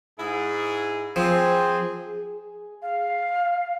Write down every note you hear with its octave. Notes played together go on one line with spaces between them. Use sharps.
G#2 E4 G#4
F3 C4 G#4
G#4
F5